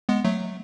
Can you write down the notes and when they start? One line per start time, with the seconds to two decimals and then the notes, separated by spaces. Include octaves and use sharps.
0.09 G#3 B3
0.25 F#3 A3